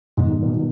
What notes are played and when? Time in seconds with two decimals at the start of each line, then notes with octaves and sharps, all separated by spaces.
0.17 G#2 D#3 G3 B3 D#4
0.42 A#2
0.49 B2